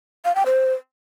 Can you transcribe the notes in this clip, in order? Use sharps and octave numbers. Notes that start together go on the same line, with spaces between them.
F5
G5
C5